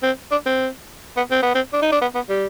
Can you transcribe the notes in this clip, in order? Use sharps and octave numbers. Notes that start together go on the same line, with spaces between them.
C4
D4
C4
B3
C4
B3
C4
D4
D#4
D4
B3
B3
G3